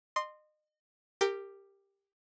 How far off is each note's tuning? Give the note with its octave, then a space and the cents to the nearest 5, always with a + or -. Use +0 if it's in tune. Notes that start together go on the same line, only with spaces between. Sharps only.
D#5 -30 C6 +0
G4 +10 A#4 -20